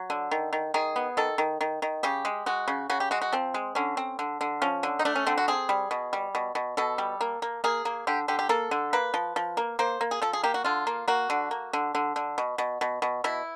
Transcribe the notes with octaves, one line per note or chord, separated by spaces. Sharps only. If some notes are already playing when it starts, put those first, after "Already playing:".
Already playing: F#3
D3
D#3
D#3
D#3 G#4
B3
D#3 A4
D#3
D#3
D#3
C#3 G4
G#3
G#3 F#4
C#3
C#3 F#4
G4
G#3 F#4
F#4
F3 C4
G#3
D3 C#4
C4
D3
D3
F3 C#4
D3
D#4
A3 D4
C#4
D3 C4
F#4
C4 G#4
G3
B2
G3
B2
B2
B2 A4
G3
A#3
A#3
A#3 G#4
A#3
D3 G4
D3 G4
G4
A#3 A4
D3
A#3 B4
F3
F3
A#3
A#3 C5
A#3
G#4
F3 A4
G#4
A#3 G4
F#4
D3 F4
A#3
A#3 F#4
D3
A#3
D3
D3
D3
B2
B2
B2
B2
B2 E4